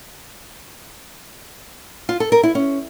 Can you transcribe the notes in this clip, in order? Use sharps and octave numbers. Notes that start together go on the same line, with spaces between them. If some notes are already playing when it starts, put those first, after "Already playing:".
F4
A4
A#4
E4
C#4